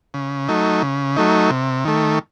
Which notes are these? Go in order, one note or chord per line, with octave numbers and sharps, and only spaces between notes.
C#3
F#3 A3 D#4
C#3
F#3 A3 D#4
C3
D#3 A3